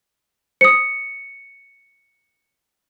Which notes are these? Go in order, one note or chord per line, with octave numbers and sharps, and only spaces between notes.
C5 D#6 C#7